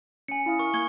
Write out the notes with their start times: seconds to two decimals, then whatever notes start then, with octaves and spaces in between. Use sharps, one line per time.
0.28 C#4 G#5 C#7
0.46 E4 F5 D#6
0.59 A#4 C#6
0.74 A#3 C#6 G#6 G7